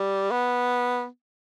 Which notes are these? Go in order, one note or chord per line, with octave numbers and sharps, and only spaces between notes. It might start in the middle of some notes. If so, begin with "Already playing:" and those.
Already playing: G3
B3